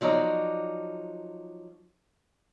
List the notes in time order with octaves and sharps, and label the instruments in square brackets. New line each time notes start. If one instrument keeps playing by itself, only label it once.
[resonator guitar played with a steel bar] F3 F#3 D#4 D5